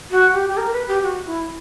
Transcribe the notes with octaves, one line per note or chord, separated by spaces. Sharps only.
F#4
G4
G4
A#4
B4
G4
F#4
E4